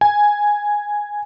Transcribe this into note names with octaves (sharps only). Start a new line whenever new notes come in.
G#5